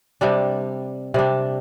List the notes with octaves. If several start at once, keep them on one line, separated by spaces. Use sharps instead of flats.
C3 G3 D4
C3 G3 D4